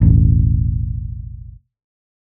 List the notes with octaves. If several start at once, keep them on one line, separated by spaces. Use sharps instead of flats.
E1 A1